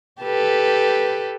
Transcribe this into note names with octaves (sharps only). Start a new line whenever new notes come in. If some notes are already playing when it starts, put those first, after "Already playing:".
G4 A4 B4